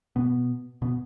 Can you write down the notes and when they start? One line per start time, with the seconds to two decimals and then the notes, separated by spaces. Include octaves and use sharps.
0.16 B2 B3
0.82 B2 B3